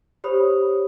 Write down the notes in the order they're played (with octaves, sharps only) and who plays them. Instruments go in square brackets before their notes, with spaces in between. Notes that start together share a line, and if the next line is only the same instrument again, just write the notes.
[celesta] G4 C5 C#5 B5 D#6